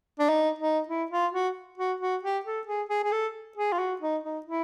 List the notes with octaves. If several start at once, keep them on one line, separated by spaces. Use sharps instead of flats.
D4
D#4
D#4
E4
F4
F#4
F#4
F#4
G4
A4
G#4
G#4
G#4
A4
G#4
F4
F#4
D#4
D#4
E4